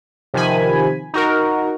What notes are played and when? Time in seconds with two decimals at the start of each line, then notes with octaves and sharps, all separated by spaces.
0.34 C3 D#3 F3 G#5 B5
1.14 D#4 F#4 A#4